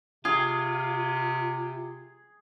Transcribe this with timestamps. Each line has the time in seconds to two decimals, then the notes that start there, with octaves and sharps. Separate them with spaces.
0.25 C3 F4 G#4